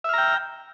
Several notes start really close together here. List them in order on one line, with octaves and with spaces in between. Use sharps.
E5 F6 A#5 G5